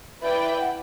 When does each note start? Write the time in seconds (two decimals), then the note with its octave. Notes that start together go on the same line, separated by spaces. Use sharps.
0.22 E4 B4 D5 E5 G5
0.41 E5
0.60 F#5